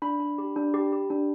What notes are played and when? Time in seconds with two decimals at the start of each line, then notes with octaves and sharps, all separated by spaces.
0.02 D4 B5
0.20 D4
0.38 G4
0.56 D4
0.74 G4
0.92 G4
1.10 D4